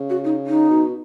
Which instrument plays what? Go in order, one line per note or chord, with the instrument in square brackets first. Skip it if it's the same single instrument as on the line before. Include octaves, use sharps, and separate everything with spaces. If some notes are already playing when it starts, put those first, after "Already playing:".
Already playing: [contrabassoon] C#3
[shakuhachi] F#4
D#4
D#4
[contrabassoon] B2